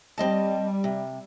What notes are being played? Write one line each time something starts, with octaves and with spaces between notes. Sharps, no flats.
G3 C4 D#5 A5
C3